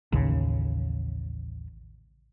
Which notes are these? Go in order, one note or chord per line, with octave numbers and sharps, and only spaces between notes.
A1 D#2 C#3